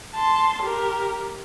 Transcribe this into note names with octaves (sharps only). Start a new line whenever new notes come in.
A5 C6
G4 A#4